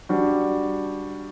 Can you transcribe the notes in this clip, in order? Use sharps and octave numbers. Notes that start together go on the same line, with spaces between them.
G3 D4 F#4